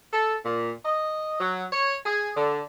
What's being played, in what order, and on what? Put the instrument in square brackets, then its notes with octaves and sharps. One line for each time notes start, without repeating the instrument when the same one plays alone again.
[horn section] A4
A#2
D#5
F#3
C#5
G#4
D3